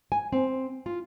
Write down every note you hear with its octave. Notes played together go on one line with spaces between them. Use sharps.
G#5
C4
F4